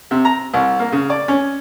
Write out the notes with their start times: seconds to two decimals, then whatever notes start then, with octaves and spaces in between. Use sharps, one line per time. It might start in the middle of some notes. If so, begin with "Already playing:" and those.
0.11 C3
0.25 A#5
0.54 C2
0.80 A#3
0.92 C#3
1.10 D5
1.28 C#4